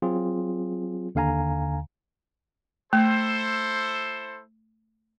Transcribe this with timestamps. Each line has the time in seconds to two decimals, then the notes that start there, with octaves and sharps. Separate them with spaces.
0.02 F#3 C4 F4 G#4
1.15 D#2 D3 F5 G#5 A#5
2.93 A3 E4 A4 C5